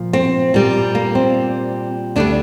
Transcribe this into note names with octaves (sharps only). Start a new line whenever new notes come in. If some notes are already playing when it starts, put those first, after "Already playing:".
Already playing: A#2 F3
C4
A#2 G3
A#3
C4
D2 D3 G3 D4